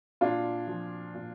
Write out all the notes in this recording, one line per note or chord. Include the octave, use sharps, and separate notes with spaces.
A#2 D4 F4
F3
A#2